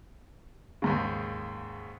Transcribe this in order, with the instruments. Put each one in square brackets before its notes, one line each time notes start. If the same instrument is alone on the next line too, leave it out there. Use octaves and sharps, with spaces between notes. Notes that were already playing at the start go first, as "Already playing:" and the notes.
[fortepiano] D#2 G#2 C#3